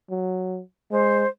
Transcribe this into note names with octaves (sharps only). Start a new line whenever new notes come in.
F#3
G#3 C5